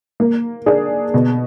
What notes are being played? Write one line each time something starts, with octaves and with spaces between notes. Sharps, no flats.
A#3
D4 G#4
B2